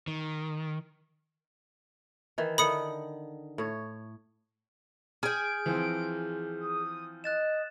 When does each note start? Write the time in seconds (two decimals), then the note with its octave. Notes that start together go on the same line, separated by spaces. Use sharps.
0.08 D#3
2.38 D#3 E3
2.58 D3 D#3 B5 D#6 C#7
3.58 A2 C#5
5.23 G#4 G#5 F6 G6 D7
5.66 E3 F3 C4
6.60 D#6
7.24 D#5 F#6 A6 E7